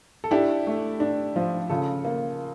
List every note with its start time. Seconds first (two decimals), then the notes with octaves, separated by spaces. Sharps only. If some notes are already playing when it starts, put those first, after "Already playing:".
0.24 A4
0.31 D4 E4 G4
0.67 A3
1.00 D4
1.36 F3
1.70 C#3 F4 A4
2.05 A#3